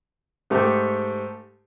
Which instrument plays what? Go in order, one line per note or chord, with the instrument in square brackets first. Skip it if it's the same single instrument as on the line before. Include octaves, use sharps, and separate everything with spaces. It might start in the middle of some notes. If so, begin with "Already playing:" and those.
[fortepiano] G#2 A3 G4